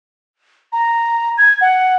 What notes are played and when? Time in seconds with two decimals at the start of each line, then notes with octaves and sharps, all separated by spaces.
0.72 A#5
1.38 G#6
1.61 F#5